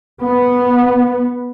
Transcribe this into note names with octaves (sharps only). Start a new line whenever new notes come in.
B3